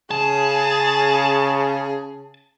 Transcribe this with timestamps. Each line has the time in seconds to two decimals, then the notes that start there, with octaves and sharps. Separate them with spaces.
0.11 C#3 G#4 A5